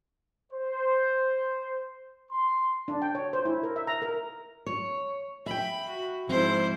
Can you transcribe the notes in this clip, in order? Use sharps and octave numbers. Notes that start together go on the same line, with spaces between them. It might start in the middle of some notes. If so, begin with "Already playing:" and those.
C5
C6
D4
G5
C#5
C5
E4
A#4
E5
A#5
A#4
C#5
E5 G5 B5
F#4
G#2 F3 C4 E4 C5